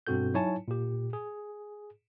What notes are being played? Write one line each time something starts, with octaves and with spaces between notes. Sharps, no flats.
G2 B2 C4 F#4 A4 G6
F#3 D#4 E4 C#5 G#5 A5
A#2 G4
G#4